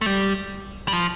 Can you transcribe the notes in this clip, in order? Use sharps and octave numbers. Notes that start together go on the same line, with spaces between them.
A3
G3
G3
F3